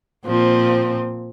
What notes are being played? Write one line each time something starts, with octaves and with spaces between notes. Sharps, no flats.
A#2 F3 C4